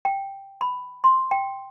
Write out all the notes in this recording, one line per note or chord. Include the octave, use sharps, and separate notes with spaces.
G5
B5
C6
G5